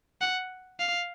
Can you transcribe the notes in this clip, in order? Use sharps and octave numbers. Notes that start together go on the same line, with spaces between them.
F#5
F5